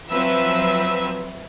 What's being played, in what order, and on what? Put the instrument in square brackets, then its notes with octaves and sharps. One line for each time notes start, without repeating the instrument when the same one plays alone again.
[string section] F3 F#3 C4 B4 E5 E6